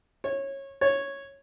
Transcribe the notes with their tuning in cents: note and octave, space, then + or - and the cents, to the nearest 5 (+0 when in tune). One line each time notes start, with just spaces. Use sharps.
C#5 -20
C#5 -5